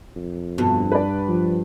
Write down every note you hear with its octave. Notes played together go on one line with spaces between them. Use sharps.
F2
G2 B2
B4 D5
F3